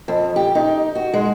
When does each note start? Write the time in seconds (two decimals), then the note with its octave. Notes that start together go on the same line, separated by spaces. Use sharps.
0.08 F2
0.36 G4
0.55 D#4
0.95 F#4
1.14 G#3